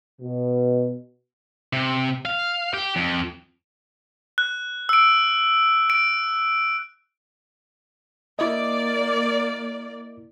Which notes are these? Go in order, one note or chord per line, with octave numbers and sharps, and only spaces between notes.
B2
C3
F5
G4
F2
F#6
E6 D7
D7
A#3 E4 D5 D#5